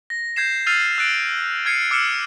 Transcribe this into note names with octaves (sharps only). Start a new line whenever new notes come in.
A#6
G6 G#6 C7 E7
E6 F6 A6 C7 D#7 F7
E6 F#6 A6 D7
F6 G#6 C7 C#7 D#7
D6 E6 F6 C#7 E7